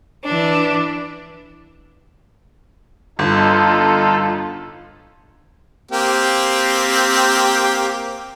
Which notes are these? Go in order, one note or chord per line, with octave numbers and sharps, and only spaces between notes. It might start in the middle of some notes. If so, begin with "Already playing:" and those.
E3 D4
G1 D#4 F4 A4
A#3 C4 G4